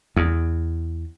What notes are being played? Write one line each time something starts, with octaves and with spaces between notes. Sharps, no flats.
E2